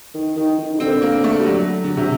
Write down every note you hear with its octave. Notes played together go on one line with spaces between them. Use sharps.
D#3
D#3
D#3
D#3
D3 C4
A#3
A3
G3
F#3
D3
C3